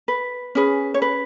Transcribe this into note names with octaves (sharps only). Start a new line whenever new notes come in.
B4
C#4 G#4 B4
C#5
B4